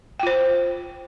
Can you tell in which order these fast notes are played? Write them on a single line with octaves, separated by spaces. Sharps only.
G5 F4 C5